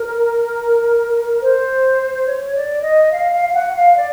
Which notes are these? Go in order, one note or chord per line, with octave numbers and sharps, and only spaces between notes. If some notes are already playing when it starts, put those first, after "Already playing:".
Already playing: A#4
C5
C#5
D5
D#5
F5
F5
F5
F#5
F5
D5